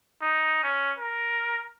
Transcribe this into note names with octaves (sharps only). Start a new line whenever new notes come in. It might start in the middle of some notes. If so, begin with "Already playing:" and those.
D#4
C#4
A#4